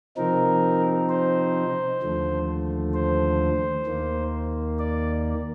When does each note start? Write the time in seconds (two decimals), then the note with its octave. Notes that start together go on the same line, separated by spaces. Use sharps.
0.16 C3 F3 C4 D#4 A#4
1.09 C5
2.02 D#2 D3 F3 A3
2.94 C5
3.86 D#2 D#3 A#3
4.79 D5